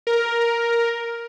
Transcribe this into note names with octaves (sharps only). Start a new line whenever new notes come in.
A#4